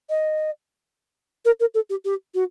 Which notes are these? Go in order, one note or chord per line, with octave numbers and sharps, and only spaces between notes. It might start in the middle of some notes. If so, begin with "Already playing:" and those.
D#5
A#4
A#4
A4
G4
G4
F#4